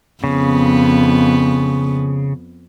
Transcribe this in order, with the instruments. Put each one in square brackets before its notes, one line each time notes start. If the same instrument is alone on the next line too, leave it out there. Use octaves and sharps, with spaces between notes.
[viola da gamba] F2 B3 [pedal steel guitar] C#3